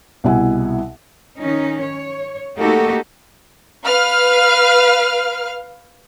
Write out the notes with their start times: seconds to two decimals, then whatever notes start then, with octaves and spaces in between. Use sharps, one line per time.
0.24 C2 B2 E4 F#5 G#5
1.39 D#3 C#4 D#4
1.79 C#5
2.59 A3 A#3 D#4 F#4 G4 A4
3.85 B4 F5 F6